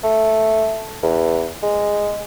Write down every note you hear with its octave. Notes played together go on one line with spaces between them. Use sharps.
A3
E2
G#3